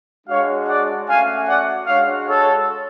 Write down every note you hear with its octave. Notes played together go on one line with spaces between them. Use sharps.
G#3 D4 F#4 C#5 F5
D5 F#5
A3 C#4 F#4 F5 G#5
D5 F#5
G#3 D4 F#4 C#5 F5
A4 C#5